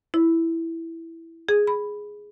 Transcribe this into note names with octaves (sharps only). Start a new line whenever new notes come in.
E4
G#4
B5